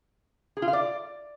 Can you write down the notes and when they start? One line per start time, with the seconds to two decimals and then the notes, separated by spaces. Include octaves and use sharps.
0.57 G#4
0.62 F4
0.68 F5
0.73 D5